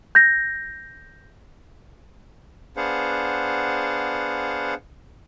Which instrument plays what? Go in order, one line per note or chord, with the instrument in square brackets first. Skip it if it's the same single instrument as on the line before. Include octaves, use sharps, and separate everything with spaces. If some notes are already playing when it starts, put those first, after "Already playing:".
[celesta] G6 A#6
[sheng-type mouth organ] B3 D4 G#4 C5 F5 F#5